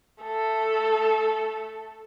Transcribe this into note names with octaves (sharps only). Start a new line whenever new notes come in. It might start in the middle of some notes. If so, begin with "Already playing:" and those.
A3 A4